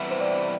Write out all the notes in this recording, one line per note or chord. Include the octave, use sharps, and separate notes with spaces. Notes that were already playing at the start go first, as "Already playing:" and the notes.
Already playing: C3 E3 G3 B3 E4
C5
D5